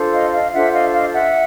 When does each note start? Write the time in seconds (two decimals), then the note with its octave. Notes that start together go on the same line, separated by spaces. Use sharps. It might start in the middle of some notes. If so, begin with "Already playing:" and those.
Already playing: D4 F4 A4 C5
0.13 D#5 F5
0.33 D#5 F5
0.53 D4 F4 A4 C5 E5 F#5
0.73 D#5 F5
0.93 D#5 F5
1.13 E5 F#5